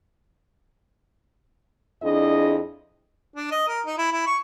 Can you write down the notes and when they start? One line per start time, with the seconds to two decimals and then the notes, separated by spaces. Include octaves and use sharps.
2.03 F2 D4 E4 G#4 D#5
3.36 D4
3.51 D#5
3.68 A#4
3.86 D#4
3.98 E4
4.12 E4
4.27 C#6